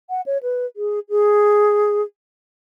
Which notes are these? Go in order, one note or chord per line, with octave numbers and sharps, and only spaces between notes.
F#5
C#5
B4
G#4
G#4